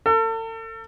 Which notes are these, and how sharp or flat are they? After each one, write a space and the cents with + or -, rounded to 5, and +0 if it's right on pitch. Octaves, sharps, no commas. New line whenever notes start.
A4 +40